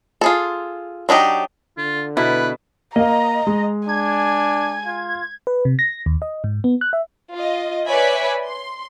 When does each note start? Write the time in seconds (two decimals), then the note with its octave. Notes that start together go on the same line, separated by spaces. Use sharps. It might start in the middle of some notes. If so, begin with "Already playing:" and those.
0.21 F4 G#4 A4
1.09 F#3 D4 D#4 G4
1.77 D3 F4
2.17 B2 E4 B4
2.96 A#3 D#5 F5 A#5
3.47 G#3
3.89 D4 G#5 G#6
4.86 F4
5.47 B4
5.65 C3
5.79 A#6
6.06 D#2
6.22 D#5
6.44 G#2
6.64 B3
6.81 F#6
6.93 E5
7.35 F4 D#5
7.86 B4 C#5 D5 E5 G#5 B5
8.46 C6